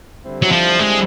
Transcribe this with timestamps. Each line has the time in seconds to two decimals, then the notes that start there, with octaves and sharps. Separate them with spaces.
0.23 D3 G3 C4 E4
0.42 F#3
0.52 F3
0.79 G#3